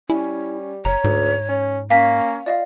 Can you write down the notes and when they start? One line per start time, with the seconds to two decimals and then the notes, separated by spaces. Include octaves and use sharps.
0.10 G3 C#4 E4 G#5
0.85 F#1 C#5 A#5
1.04 D2 G#2
1.48 C#4
1.90 A#3 C#4 F5 G#5 B6
2.46 F4 D5 D#5 F5